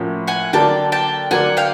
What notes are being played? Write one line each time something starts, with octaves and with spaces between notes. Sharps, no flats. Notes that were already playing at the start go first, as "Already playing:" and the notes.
Already playing: A2 F3 A#3 C#4 F#4
F#5 G#5
D3 F#3 A#3 D4 G5 A5
G5 A5
D3 F#3 A#3 D4 F#5 G#5
F5 G5